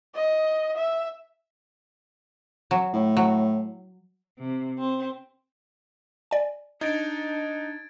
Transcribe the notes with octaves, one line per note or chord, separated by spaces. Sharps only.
D#5
E5
F#3
A2
F#3
C3
C4
D5 G#5
D4 D#4 G#6 A6 D7